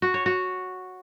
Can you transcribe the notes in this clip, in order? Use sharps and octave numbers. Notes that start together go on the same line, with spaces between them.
F#4
C#5
F#4